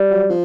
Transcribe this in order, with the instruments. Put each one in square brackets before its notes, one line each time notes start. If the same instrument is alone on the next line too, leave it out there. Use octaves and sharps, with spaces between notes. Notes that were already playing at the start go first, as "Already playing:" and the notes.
Already playing: [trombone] G3
[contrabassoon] F#3
F3